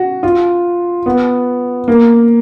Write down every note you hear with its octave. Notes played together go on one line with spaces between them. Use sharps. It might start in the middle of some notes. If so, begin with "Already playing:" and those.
Already playing: F#4
F4
B3
A#3